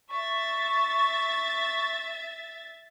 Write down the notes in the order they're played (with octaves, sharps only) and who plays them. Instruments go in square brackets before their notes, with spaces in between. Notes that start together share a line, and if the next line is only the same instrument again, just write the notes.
[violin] E5 A6 [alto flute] C#6